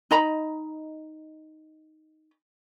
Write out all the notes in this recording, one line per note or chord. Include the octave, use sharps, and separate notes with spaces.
D#4 D#5 A#5 B5